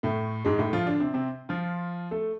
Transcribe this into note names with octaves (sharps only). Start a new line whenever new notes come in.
A2 A3
G#2 G#3
A2 A3
F3 F4
D3 D4
C3 C4
C3 C4
F3 F4
A3 A4